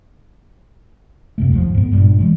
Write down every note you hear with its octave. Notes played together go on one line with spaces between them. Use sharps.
F2 C3 A3
G#1 D#2 F3
G#2 B3
G1 G2 A#2 G3
E3 G#3 A3